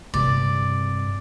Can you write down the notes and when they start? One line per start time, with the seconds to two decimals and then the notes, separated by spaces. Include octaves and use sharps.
0.14 G2 C3 D5